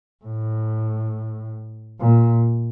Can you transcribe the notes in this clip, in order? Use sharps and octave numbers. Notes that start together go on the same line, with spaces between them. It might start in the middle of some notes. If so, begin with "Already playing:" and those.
A2
A#2